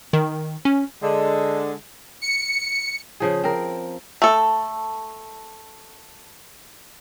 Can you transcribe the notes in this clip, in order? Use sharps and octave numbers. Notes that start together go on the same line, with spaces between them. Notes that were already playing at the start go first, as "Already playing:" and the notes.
D#3
C#4
D3 G#3
C#7
C#3 F3 G#4
C4 A#4
A3 A4